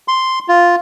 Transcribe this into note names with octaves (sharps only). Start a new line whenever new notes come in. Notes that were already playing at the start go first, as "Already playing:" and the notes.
C6
F4